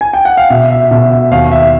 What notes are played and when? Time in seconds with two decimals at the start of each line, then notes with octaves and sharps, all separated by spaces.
0.01 G#5
0.13 G5
0.25 F#5
0.37 F5
0.50 B2 E5
0.70 E5
0.91 B2 E5
1.12 E5
1.31 D#2 F5
1.51 E5